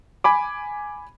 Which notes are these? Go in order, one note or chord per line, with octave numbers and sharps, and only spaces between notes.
G#5 B5 D6